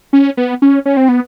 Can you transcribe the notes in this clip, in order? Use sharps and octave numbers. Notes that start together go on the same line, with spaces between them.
C#4
B3
C#4
C#4
C4
B3